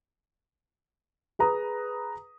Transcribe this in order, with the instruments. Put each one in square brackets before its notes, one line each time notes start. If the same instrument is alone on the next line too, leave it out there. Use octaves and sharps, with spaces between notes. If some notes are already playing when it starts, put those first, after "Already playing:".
[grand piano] G#4 B4 A#5 D#6